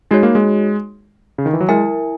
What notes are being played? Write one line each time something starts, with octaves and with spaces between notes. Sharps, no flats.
G#3 D#4 F#4 C#5
A#3
G#3
C#3
D#3
E3
F#3
G#3 E4 A#4 E5 G#5